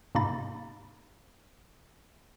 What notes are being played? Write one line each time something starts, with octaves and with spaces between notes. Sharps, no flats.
G#2 C3 A#3 D#4 B5 A6